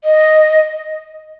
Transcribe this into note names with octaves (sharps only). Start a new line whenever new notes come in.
D#5